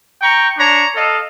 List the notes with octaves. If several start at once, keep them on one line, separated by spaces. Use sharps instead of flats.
G5 A#5 C#6
D4 C#5 A#5
A4 D#5 F5